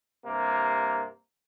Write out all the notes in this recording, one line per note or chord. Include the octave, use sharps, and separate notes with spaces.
G2 C3 A#3